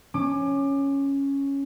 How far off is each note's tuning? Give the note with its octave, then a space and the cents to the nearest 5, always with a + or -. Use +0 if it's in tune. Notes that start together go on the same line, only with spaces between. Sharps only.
C#4 +0 D6 +25